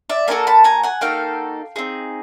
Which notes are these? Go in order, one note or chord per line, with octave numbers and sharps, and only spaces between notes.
D5 E5
A#3 D#4 F#4 A4 G#5 A#5
A5 B5
G#5 A#5
F#5 G#5
A#3 D#4 F#4 A4 F5 G5
C4 D#4 G#4